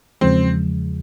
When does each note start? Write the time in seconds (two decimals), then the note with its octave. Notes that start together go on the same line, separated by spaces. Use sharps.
0.21 E2 C#3 F3 G#3 C4